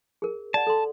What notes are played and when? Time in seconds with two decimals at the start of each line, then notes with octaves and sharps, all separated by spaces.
0.22 G#4 A#4
0.54 D5 F#5 A5
0.67 A4 C6